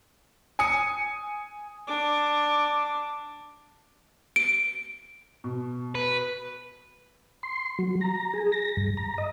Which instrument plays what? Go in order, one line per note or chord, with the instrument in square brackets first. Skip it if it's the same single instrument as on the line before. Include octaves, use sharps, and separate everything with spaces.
[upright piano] G#5 D#6 C#7
[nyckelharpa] D4 D6
[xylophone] D7
[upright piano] B2
[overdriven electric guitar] B4
[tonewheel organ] C6
F#3
A#5
G#4
A#6
G2
A#5
D#5